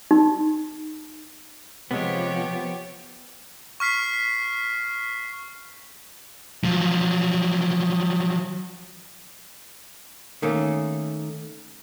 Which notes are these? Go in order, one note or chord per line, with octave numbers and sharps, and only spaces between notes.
D#4
C3 F3 G#3 B3 G4 C#5
C#6 F6 B6 C7
F3 F#3
D#3 A3 A#3 C#4